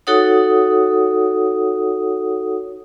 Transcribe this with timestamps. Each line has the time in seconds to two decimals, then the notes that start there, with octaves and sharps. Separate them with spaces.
0.07 D#4 F#4 A4 C#5 F#5 D#6